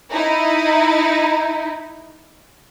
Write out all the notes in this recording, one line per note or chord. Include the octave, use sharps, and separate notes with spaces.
D#4 E4